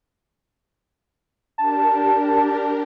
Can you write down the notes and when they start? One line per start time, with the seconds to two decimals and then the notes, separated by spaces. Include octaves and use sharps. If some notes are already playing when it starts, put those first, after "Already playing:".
1.58 D4 G4 A#4 A5